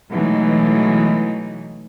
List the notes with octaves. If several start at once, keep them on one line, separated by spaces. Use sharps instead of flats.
B2 E3 F#3 G#3 A3 D#4